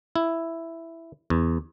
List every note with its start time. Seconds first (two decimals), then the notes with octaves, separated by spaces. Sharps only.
0.16 E4
1.30 E2